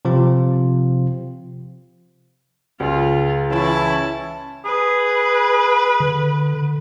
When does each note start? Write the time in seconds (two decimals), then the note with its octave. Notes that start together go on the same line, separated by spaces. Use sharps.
0.05 C3 F3 C4 F4
2.80 C#2 F4
3.52 E3 C#4 E4 A5
4.65 G#4 B4
6.00 D3